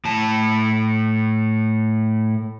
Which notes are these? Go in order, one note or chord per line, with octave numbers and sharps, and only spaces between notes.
A2 A5